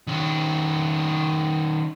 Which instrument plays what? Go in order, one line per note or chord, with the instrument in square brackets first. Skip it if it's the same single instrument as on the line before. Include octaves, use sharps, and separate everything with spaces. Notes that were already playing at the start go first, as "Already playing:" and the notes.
[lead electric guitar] D#3 C#4